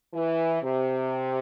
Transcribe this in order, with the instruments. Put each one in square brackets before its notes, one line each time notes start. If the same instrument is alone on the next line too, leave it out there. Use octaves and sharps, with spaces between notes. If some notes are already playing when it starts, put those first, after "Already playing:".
[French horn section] E3
C3